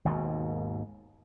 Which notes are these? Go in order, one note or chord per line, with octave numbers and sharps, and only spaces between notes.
G#1 D#2 G#2 B2